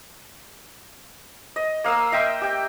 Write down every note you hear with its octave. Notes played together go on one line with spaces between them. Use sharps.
D#5
A#3 F5 D#6 E6
D#5 E5 G5 C6
G4 G5